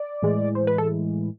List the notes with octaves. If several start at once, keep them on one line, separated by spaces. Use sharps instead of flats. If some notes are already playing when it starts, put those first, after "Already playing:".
Already playing: D5
A2 E3 G#3
C5
B4
A4